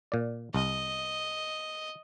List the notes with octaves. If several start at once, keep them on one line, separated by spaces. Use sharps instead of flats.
A#2 D5
C2 D#5